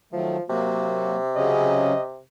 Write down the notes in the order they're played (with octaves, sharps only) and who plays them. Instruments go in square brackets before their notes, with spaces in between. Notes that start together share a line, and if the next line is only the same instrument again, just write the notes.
[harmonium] D#3 F#3 A3 [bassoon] F3
[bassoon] C3 [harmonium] F#3 A#3 F#4
[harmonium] C#3 F#3 C#4 [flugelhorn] D#5